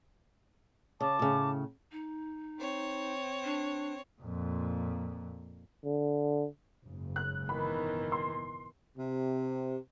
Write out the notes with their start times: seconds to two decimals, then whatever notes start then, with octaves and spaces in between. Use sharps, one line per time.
1.01 C#3 A5 D6
1.19 A2 C#3
1.92 D#4
2.60 C4 C#5
3.44 D4
4.22 F2 A#2
5.84 D3
6.85 F#1 G#2 C#3
7.16 F#6
7.49 B2 D#3 E3 B5
8.12 C6
8.98 C3